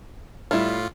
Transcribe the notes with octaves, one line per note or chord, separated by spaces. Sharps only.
A2 G3 E4 F4